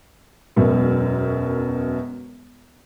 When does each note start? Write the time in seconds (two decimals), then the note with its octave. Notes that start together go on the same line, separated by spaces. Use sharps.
0.56 E1 F#2 B2